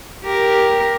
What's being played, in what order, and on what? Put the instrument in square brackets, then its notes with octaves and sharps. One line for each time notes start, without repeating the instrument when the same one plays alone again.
[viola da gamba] G4 A#4